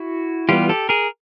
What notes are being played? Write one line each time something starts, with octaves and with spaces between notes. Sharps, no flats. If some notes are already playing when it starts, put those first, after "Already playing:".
Already playing: E4 F#4
E3 G3 B3 F4 G4
G4 A4
G#4 A#4